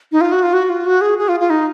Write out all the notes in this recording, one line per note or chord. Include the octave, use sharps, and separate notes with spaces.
D#4
F4
F#4
F4
F#4
F4
F#4
G#4
G#4
F4
F4
D#4